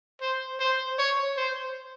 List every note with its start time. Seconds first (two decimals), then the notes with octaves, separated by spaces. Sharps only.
0.21 C5
0.60 C5
0.99 C#5
1.37 C5